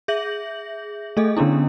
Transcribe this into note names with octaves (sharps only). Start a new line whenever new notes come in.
G#4 E5 G6 A#6 F#7
A3 G#4 A4 D#5
D3 B3 C#4 D4 E4